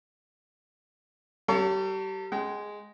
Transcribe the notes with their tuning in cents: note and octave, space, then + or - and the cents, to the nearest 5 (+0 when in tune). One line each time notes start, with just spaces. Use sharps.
G3 -30 A4 +35 C#5 +30
G#3 +0 G5 -40